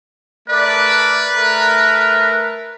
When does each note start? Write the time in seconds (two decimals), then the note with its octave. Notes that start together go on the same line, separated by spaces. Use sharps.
0.49 A3 A#4 B4 D5
1.33 A3 A#4